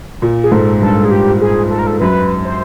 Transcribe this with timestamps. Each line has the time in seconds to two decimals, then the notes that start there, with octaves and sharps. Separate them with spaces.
0.22 A#2
0.44 G#4
0.51 G#2 A4
0.82 G2 A4
1.05 G#4
1.11 G4
1.41 G#4
1.70 A4
1.79 A#4
1.87 A4
2.00 F#2 B4
2.45 C5